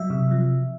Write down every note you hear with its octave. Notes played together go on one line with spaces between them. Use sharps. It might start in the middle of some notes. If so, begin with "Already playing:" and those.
Already playing: F#3 E5
C3
F3